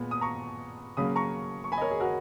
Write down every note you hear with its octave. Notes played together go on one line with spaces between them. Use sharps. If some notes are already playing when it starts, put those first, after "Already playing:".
Already playing: A#2 G#3 B3 B5
D#6
A#5 C#6
C#3 F#3 A#3 B5 D#6
A#5 C#6
C#6
G#5 B5
D#5
A#4 C#5
G#4
F#4 A#4